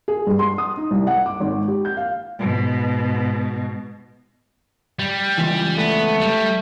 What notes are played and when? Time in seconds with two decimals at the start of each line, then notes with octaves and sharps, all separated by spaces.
0.08 G#4
0.27 G2
0.39 C6
0.58 D#6
0.77 D#4
0.91 C2
1.07 F#5
1.26 D6
1.40 G#1
1.68 G4
1.85 G6
1.97 F5
2.39 G#2 B2
4.99 G3
5.38 C#2 E3
5.78 A3 B3
6.21 G3